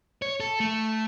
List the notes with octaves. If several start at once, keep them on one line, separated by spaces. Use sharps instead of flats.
C#5
A4
A3